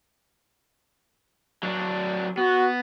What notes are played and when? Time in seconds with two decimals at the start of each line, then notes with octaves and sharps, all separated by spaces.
1.63 F#3 D4
2.37 B3 F#4